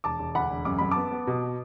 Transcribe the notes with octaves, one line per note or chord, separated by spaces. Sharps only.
E1 A5 D6
E1
D2 F#5 B5
E1
F#2 D6
F#2 B5
B3 A5 D6
B3
B2